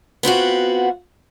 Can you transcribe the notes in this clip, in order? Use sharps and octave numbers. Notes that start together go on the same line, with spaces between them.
B3 C4 F4 F#4